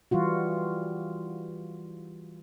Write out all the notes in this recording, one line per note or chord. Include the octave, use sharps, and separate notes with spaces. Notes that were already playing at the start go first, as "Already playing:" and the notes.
E3 G3 F4 F#4